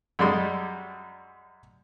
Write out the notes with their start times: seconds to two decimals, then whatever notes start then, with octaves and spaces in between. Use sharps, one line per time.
0.19 F#2 G3 G#3 D5 C6 D#6